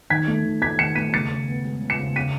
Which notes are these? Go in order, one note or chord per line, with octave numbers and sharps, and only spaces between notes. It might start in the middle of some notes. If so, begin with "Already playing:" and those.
D#3 G#6 B6
A3
D#3
A3 G#6 B6
D#3 C#7 E7
A3 B6 D#7
C#3 A6 C#7
C#3
B3
G#3
C#3
C#7 E7
C#3
C#3 B6 D#7